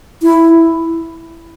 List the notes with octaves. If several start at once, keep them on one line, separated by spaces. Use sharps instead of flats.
E4